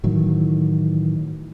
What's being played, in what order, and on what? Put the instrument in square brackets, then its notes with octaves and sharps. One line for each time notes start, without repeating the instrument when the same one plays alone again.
[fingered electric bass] A2 D#3 E3 F#3